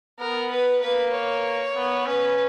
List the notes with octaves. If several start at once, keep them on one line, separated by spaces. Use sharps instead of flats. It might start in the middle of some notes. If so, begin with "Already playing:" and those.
B3 A#4
B4
A#3 B4
C#5
B3
C#4 B4